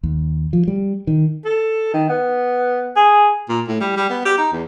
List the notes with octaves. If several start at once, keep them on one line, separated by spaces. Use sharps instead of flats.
D#2
F3
G3
D#3
A4
D#3
B3
G#4
A#2
A2
G3
G3
B3
G4
D#4
E2